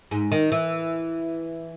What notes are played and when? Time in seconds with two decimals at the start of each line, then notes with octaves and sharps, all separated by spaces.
0.11 G#2
0.32 D#3
0.52 E3